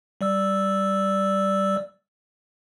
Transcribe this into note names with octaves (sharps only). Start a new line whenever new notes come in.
G3 D5 E6